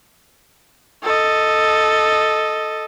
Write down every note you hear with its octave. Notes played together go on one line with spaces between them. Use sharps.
A4 D#5